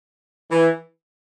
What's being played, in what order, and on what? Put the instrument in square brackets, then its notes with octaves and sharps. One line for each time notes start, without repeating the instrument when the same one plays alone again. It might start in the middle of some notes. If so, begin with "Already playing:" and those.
[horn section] E3